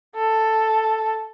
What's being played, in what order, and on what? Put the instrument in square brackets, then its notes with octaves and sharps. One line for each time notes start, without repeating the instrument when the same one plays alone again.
[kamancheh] A4